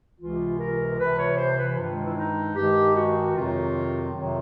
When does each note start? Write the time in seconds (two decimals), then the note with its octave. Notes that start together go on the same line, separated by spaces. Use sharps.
0.19 C#2 C3 E3 F4
0.59 A#4
0.98 C#2 C3 E3 B4
1.18 C#5
1.37 C5
1.58 B4
1.77 G2 D#3 G#3 F4
2.06 E4
2.16 D#4
2.55 G2 D#3 G#3 G4
2.95 F#4
3.34 F2 C3 D#3 F#3 F4
4.13 F2 C3 D#3 F#3 F4